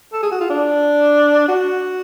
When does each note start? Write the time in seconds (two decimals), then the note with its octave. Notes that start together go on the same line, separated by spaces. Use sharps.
0.13 A4
0.23 G#4
0.31 F#4
0.41 F4
0.50 D4
1.48 F#4